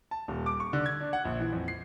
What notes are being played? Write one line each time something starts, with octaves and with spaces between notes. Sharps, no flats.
A5
D#1
D6
C#6
D3
G#6
D4
F#5
A#1
E3
F2
C7